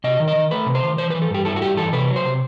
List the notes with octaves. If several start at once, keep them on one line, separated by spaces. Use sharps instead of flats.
C3 D#5
D#3
D#5
D#3
A3 B4
C3
C5
D#3
E3 C5
B4
E3
A4
G2 G4
E4 A4
F#4
G2 G4
E3 A4
C3 B4
F#3
C5
C3